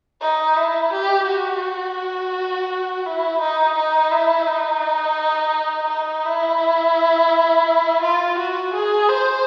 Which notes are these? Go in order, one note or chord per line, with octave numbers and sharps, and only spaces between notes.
D#4
E4
G4
F#4
E4
D#4
D#4
E4
D#4
D#4
E4
F4
F#4
G#4
C5